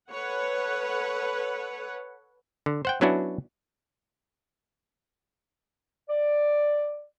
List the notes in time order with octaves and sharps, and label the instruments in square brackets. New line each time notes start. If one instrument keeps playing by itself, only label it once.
[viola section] A4 B4 C#5 F#5
[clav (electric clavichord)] D3
C5 F#5 G5
F#3 B3 C#4 D4 E4 F#4
[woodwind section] D5